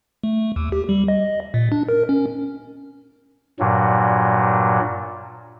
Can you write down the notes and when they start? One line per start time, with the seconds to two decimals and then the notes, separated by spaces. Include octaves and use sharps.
0.24 A3
0.56 D#2
0.72 G4
0.89 G3
1.08 D#5
1.54 A#2
1.72 D4
1.89 A#4
2.09 C#4
3.59 G2 A#2 F#3